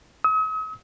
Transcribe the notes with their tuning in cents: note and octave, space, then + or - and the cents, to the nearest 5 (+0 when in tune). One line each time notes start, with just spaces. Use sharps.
D#6 +45